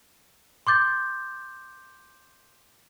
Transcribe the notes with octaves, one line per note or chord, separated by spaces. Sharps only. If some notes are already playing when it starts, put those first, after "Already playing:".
C6 D6 G6 A6